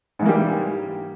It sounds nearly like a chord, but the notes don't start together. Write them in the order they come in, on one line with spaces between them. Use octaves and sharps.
G#2 E3 A#3 G3